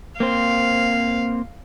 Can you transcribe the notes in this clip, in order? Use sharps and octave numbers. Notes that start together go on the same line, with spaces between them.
A#3 C4 C5 F5